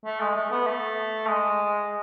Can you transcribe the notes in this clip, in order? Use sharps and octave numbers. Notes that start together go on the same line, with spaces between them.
A3
G#3
A3
B3
A3
G#3